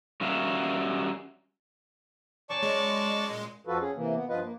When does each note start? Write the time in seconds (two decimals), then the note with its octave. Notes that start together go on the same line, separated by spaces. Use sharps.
0.21 G3 C#4 F#4 A#4 E5 F5
2.50 F#2 C#4 G#4 D5 A5 C#6
2.63 G#3 A4
3.29 A#2
3.67 F2 F3 F4 F#4 A4 B4
3.80 C#4 G#4
3.96 C3 E3 A#3
4.15 B3
4.29 G2 F3 F4 B4 D#5
4.43 A#3